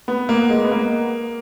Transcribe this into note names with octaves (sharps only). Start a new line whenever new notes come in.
B3
A#3
G#3
B3
A#3